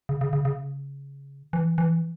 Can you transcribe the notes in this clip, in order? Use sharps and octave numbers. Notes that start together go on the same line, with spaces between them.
C#3
C#3
C#3
C#3
E3
E3